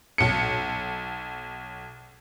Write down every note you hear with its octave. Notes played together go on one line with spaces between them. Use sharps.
B1 C#7